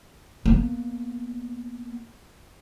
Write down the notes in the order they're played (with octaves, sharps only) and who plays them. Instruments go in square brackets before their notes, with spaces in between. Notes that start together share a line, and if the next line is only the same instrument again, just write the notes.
[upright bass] A#3 B3